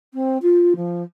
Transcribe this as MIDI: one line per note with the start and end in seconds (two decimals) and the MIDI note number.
0.14 0.38 60
0.42 0.74 65
0.76 1.02 53